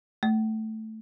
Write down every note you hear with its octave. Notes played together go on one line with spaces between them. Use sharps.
A3